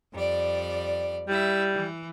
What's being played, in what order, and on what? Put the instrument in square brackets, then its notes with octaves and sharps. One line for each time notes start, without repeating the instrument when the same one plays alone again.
[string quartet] F2 G3 D5
[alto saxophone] G3 [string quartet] E4 E5
[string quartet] E3